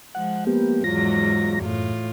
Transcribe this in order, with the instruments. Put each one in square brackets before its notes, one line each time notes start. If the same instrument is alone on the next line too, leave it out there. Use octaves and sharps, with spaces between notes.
[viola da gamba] F3 G#3 [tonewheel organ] F#5
[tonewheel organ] A#3 B3 G4
[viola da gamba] E2 G#2 F#3 [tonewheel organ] F4 A#6
[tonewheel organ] F#2 [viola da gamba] A2 F4